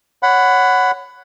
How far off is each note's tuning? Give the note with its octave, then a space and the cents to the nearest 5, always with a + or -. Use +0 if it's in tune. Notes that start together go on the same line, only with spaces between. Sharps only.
C#5 +0 F#5 +0 B5 +20